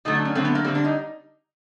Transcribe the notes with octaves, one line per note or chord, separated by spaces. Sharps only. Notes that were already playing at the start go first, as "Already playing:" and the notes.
D3 F#3 A3 D#4
D4
C#4
D3 F#3 A3 C4
B3
A#3
D3 G3 C4
D4
D#4